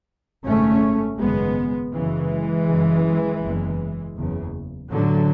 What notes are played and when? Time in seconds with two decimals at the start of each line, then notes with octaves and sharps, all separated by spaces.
0.45 G#1 F#2 C#3 A3 C#4
1.19 G#1 F#2 C#3 G#3 B3
1.93 F#1 F#2 C#3 E3 G#3
2.67 F#1 F#2 C#3
3.42 F#1 E2 C#3
4.16 F#1 E2 C#3
4.90 A1 A2 D3 F#3